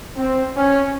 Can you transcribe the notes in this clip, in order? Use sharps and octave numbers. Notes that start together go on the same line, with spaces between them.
C4
C#4